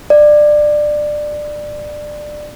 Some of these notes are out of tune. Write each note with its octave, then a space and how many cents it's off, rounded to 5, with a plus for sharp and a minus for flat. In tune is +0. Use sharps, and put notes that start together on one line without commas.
D5 +20